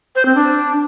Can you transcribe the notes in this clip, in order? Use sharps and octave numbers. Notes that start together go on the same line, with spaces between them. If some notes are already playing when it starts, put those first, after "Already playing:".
C5
C4
D4